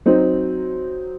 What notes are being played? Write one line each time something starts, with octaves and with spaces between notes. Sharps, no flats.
F#3 C4 D#4